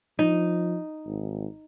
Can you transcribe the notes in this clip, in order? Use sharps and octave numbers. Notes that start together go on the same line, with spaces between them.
F3 D#4
G#1